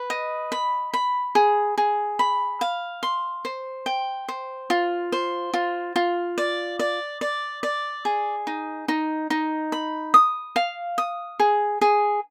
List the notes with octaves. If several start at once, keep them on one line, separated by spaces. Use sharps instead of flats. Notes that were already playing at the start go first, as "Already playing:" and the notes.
Already playing: B4
D#5
B5
B5
G#4
G#4
B5
F5
C6
C5
G5
C5
F4
C5
F4
F4
D5
D5
D5
D5
G#4
D#4
D#4
D#4
B5
D#6
F5
D#6
G#4
G#4